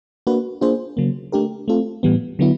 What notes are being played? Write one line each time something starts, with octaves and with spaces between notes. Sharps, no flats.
A#3 D4 F#4 B4
A#3 D4 F4 G#4 C5
C#3 F#3 A#3
A3 D4 G4 A#4
A3 C4 F4 A4
A2 E3 G3 B3
D3 F#3 B3 E4